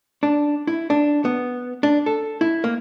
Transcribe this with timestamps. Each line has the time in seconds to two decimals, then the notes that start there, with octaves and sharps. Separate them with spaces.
0.23 D4
0.67 E4
0.90 D4
1.25 B3
1.83 D4
2.06 A4
2.41 E4
2.64 A#3